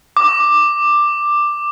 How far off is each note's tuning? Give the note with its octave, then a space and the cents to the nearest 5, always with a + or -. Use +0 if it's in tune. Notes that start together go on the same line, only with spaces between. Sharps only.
D6 +10